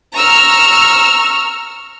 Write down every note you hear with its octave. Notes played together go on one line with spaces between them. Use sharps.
A#5 C#6 E6 F6